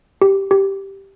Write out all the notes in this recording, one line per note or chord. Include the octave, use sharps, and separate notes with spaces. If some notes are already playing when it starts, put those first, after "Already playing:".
G4
G4